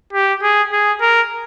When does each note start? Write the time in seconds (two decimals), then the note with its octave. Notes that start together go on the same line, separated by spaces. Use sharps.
0.13 G4
0.42 G#4
0.72 G#4
1.01 A#4